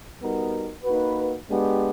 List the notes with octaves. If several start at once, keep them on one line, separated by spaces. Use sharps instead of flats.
G3 B3 D#4 F#4 A#4
A#3 D#4 F#4 B4
G#3 B3 D4 G4